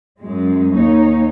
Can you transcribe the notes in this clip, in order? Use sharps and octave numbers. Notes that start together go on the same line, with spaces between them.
F#2 G#3
D#2 D#4 C#5